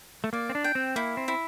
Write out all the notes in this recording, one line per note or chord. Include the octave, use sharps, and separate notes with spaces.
A3
A#3 D5
C4
D4
G5
C4
A#3 E4
C4
E4